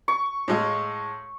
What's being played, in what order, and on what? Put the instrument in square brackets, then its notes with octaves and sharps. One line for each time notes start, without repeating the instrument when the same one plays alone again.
[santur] C#6
[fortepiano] A2 G#3 F5